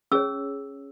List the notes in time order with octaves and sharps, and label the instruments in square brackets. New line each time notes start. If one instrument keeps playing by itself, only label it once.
[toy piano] C#4 G#4 C#5 E6